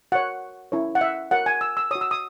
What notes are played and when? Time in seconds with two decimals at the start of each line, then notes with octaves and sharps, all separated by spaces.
0.12 F#4 A#4 C#5 F#5
0.72 C#4 E4 A#4 C#5
0.95 F#5
1.01 E5
1.31 F#4 A#4 C#5 F#5
1.46 G#5
1.61 E6
1.77 E6
1.91 F#4 C#5 D#6
2.01 E6
2.11 D#6